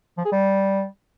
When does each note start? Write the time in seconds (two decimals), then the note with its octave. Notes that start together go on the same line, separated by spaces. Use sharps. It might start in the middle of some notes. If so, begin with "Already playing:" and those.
0.18 F3
0.25 G#4
0.32 G3